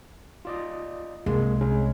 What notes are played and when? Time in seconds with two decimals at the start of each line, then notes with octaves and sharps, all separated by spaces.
0.45 F4 D5 D#5
1.26 C2 G#3 A#3
1.61 G#3 C#4